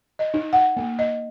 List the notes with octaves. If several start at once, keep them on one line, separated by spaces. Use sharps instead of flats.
D#5
D#4
F#5
A#3
D#5